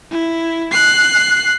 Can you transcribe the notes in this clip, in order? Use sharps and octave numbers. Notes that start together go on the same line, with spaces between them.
E4
F#6 C7